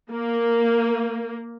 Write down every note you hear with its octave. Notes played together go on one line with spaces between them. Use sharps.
A#3